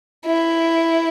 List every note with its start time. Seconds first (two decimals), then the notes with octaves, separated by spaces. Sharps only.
0.26 E4